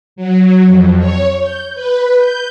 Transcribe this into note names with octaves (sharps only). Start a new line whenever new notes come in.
F#3
F2
C#5
G6
B4
G6